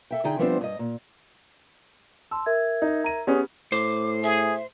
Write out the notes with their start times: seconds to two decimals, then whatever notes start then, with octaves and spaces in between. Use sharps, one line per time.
0.11 A4 E5 G5
0.24 D3 D#4 G#4 G5
0.39 F3 G3 B3 C4 D4 C5
0.61 G2 D#5
0.79 A#2
2.31 A5 C6 E6
2.46 A#4 E5 G#6
2.82 D#4
3.04 A#5 D#7
3.27 B3 C#4 G4 G#4
3.72 A2 C5 D6
4.24 G#4 E5